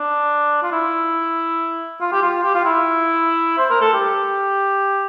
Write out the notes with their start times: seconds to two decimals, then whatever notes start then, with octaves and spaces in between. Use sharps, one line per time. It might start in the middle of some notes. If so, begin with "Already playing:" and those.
Already playing: D4
0.63 F4
0.72 E4
2.01 F4
2.12 G4
2.22 F4
2.44 G4
2.55 F4
2.65 E4
3.58 C5
3.70 A#4
3.81 A4
3.93 G4